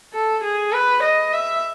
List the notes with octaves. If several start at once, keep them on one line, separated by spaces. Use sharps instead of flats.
A4
G#4
B4
D#5
E5